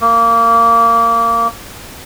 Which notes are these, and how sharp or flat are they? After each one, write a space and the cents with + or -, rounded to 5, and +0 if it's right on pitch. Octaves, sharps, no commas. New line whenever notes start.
A#3 -20